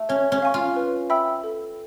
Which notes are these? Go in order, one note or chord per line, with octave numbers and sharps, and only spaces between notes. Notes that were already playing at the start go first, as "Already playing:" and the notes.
Already playing: A3
C#4 C#5
C#4
F5 G#5 C#6
F4
B4
E5 G5 B5 E6
A4